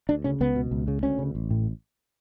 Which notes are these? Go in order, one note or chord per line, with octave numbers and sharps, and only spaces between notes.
D2 D4
C#3 C#4
C#2 B3
B2
C#2
C#3
D2 C#4
C#3
A1
A2